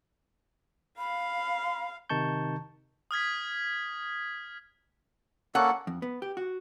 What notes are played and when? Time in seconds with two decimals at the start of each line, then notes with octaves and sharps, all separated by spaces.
0.98 F5 B5
2.09 C3 D#3 D#4 A5 C#6 G6
3.11 D#6 F6 G#6 B6
5.55 A#3 C#4 A4 F#5
5.87 F2
6.02 B3
6.22 G4
6.37 F#4